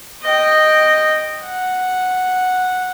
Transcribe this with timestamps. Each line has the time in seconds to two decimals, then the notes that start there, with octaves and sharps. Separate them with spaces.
0.22 D#5 G5
1.44 F#5